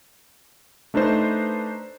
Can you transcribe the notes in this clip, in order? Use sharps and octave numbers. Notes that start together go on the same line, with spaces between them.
A3 D4 D#4 B4 C5